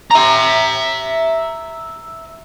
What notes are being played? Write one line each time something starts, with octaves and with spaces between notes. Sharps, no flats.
E5 A#5